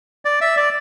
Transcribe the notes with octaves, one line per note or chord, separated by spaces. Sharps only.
D5
E5
D5